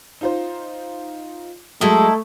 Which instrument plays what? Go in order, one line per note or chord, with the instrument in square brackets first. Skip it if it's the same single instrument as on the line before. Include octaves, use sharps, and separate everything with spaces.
[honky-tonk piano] D#4 F4 C5
[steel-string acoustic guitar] F#3 G#3 [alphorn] A3 [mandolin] D#4 E4 A4